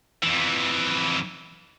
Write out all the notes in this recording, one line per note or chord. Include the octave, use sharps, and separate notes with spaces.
F2 E3